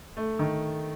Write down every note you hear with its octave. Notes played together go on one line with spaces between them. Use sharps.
A3
D#3